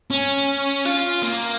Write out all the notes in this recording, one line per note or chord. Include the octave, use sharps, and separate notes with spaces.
C#4
F4
A#3